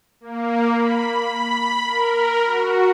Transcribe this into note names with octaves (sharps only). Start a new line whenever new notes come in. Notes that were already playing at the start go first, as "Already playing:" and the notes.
A#3
B5
B5
A#4
F#4